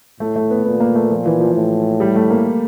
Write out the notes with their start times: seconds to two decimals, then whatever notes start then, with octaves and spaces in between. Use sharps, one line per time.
0.20 A2 A3
0.36 A3
0.50 B3
0.65 A#2 B3
0.80 A#3
0.95 A3
1.10 F3
1.26 E3
1.40 F3
1.55 A2
2.00 G3
2.16 A3
2.30 A#3